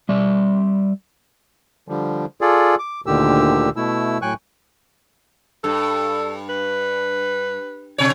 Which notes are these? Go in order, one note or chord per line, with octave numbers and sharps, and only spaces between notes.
G3 D5 E5
D3 F3 G3
F4 G#4 A4 D5
D6
D2 A#2 D3 D#3 G4 E6
B2 A3 E4 E6
A2 F#3 G5 G#5 C#6 F#6
G2 A4
B4
B2 C#5